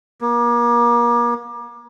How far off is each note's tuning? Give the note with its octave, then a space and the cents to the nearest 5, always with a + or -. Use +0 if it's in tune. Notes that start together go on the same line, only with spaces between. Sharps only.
A#3 +35